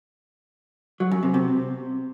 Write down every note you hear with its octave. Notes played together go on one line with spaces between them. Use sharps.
F#3
F#2
C3
C3